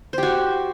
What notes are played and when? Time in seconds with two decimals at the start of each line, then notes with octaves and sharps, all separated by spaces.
0.13 C5
0.18 G4
0.23 F#4